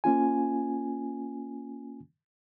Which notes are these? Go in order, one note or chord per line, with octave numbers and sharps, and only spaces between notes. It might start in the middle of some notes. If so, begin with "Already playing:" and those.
A#3 C#4 F4 G#5